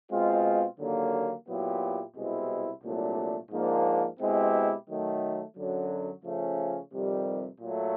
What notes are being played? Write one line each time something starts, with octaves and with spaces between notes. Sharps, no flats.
B2 G#3 C4 F4
D#2 D3 F#3 A#3
A#2 F#3 B3 E4 G4
C2 B2 G#3 C4 E4
C2 A#2 F#3 A3 D4
G#2 F3 A#3 D4
B2 G#3 C4 E4 G4
D#3 F#3 A3
F#2 D3 F#3
C#3 F3 A3 C#4
F2 C3 D#3 G3
A#2 F#3 A3